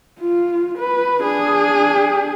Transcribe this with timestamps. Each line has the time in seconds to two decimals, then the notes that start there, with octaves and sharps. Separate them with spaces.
0.20 F4
0.78 B4
1.21 D4 G#4